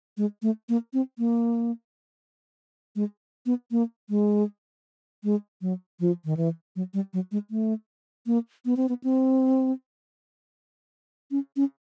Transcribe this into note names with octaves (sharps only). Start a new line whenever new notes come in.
G#3
A3
A#3
C4
A#3
G#3
B3
A#3
G#3
G#3
F#3
F3
D#3
E3
F#3
G3
F#3
G#3
A3
A#3
B3
C4
B3
C4
C#4
C#4